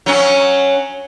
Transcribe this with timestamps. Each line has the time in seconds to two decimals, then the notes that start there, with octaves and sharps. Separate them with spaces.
0.06 F#3 C#4